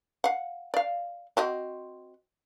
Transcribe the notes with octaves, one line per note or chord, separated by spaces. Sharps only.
F5 F#5
D5 F5
C4 F#4 D#5